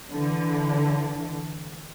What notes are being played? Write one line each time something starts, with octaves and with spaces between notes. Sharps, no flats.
D3 E3